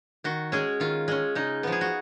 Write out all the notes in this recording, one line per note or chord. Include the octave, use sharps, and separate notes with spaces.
D#3 F#4
G#3 C#4 G#4
D#3 F4
G#3 C#4
C#3 D#4
F3 B3
G#4
F#4